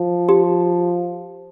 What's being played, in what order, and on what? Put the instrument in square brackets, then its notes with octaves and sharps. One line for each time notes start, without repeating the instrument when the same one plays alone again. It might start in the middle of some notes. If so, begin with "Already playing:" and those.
Already playing: [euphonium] F3
[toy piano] G4